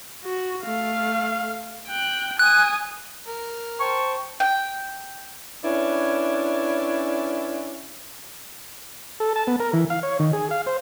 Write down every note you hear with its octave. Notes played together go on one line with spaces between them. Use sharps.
F#4
A3 F5
G5 F#6
G#5 D#6 F#6
A#4
C5 G5 A5 C#6
G5
C#4 D4 E4 B4
A4
A5
B3
A#4
E3
F5
C#5
D#3
G#4
F5
C5